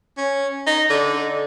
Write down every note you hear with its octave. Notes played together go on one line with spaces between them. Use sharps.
C#4
D#4
D3